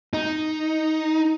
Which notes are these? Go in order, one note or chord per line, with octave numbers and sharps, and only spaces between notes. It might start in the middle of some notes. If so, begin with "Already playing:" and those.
D#4